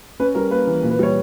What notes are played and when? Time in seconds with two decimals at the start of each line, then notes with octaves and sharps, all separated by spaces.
0.20 C#4 B4
0.35 G3 A#4
0.51 A#3 B4
0.67 E3
0.83 A#2
0.91 B4
0.99 G3 C#5